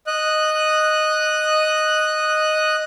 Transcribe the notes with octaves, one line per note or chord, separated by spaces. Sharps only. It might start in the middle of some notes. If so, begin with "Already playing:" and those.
D#5 F#6